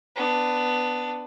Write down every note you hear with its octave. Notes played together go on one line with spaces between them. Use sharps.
B3 D4